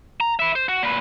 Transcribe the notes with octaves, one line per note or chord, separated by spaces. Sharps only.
A#5
B4 E5
C5
F#4
A#2 B4